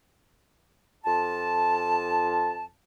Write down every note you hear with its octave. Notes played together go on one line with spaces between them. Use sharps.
F2 F4 A5